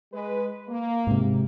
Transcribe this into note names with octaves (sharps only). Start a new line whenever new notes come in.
G#3 B4
A#3
G#2 C3